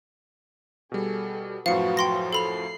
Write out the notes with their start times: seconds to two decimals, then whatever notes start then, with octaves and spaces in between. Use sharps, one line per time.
0.92 B2 G3 G#4 A4
1.66 F#2 A2 F3 F#4 B4 F5 C#7
1.97 G5 C6 A#6
2.33 A4 B5 C7 F7